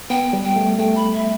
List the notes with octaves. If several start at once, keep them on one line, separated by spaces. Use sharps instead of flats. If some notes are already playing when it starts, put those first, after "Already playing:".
B3 G5
G3
G5
A3
A3 G5
B5
E5